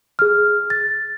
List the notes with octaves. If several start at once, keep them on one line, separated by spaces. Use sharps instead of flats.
G#4 F6
A6